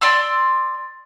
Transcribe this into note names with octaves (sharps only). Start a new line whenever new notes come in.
D5 C6 E6